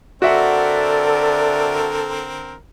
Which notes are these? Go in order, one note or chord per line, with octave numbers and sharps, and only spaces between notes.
D3 C4 F#4 A4 A#4 D5 E5 F#5